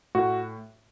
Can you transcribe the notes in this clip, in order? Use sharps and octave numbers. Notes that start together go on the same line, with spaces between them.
A2 F#4